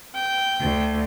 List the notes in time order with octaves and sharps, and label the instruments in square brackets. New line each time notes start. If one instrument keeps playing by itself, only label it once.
[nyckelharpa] G5
[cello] D2